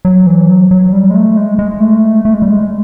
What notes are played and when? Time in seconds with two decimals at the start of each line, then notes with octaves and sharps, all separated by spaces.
0.05 F#3
0.27 E3
0.49 F#3
0.71 F#3
0.93 G3
1.11 G#3
1.15 A3
1.37 G#3
1.59 G#3
1.80 A3
2.25 A3
2.34 G#3
2.42 G3
2.50 G#3